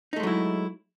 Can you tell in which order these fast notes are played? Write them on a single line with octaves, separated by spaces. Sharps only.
D#4 A3 G#3 F#3 E4